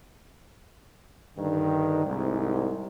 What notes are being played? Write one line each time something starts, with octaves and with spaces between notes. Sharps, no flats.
G2 D3 D#3
C2 G#2